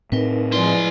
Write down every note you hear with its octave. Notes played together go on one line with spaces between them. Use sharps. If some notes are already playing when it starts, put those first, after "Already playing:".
A2 C4 D#4 A#4 B4
F3 G#3 E4 B4 D5 C6